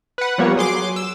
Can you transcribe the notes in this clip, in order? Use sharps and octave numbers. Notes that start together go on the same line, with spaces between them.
B4 F#5
F3 G3 A#3 B3 C#5
F#3 G#4 C6 D6
E6